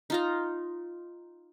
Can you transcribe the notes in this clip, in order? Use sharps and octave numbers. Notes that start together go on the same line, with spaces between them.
D#4 F4 A#5